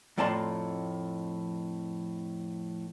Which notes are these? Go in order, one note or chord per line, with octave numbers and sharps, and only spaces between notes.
F2 A2 D5 A5 A#5 C6